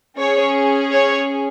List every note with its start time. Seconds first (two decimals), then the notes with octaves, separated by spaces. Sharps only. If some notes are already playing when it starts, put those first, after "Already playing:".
0.18 C#4 G#4 C#5
0.93 C#5